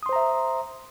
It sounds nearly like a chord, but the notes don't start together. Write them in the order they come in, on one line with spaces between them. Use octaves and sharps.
D#6 C6 C5 A#5 E5